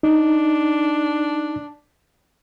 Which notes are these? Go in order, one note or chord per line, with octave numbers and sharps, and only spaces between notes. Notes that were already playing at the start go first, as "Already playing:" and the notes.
D4 D#4